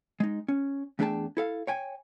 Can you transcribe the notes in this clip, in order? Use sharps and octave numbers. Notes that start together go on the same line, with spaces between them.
G#3 D#4
C#4
E2 A3 D4 G#4 G5 A5
E4 A4 F5
C#5 G5 G#5